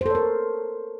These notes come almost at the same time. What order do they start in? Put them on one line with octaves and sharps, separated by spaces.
C5 A4 C#5 A#4